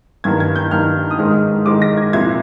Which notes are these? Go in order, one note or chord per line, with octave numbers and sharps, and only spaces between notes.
G2 D#3 A#3 G#6
G#6
G6
G2 D#3 A#3 F6
D#6
G#2 D#3 G#3 F6
G#2 D#3 G#3 D6
A#6
G#6
C2 A#2 F3 G#6